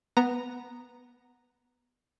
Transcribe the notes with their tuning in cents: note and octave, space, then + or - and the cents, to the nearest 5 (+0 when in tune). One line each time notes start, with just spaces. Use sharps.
B3 +0 A#5 +0